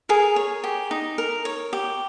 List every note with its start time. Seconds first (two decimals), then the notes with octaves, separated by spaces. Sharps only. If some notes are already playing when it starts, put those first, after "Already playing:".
0.09 G#4 A#4 G#5
0.36 C#5
0.64 G4
0.91 D#4
1.18 A#4
1.45 C#5
1.73 G4